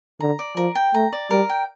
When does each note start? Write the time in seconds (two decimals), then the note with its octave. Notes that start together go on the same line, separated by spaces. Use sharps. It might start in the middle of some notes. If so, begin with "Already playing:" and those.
0.20 D3 A#5
0.39 D5
0.57 F3 A#4
0.75 G5
0.94 A3 A#5
1.12 D5
1.31 G3 A#4
1.49 G5